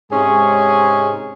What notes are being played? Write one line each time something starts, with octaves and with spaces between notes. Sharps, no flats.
G#2 C3 G#3 C#4 G#4 C#5